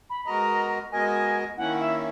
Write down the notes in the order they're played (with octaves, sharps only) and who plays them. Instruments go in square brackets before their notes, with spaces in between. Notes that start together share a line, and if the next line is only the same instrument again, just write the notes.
[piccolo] B5
[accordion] G#3 B3 F#4 A#4 D#5 [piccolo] A#5
[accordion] G#3 B3 F#4 A#4 D#5 [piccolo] G#5
[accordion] D#3 A#3 C#4 E4 [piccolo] F#5
[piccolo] E5